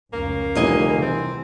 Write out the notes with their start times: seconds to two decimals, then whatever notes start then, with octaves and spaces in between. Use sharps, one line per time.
0.13 F1 C#2 A#3 C#4
0.55 F1 E2 D3 E3 G3 D#5 G#5
1.02 C3 E3 C4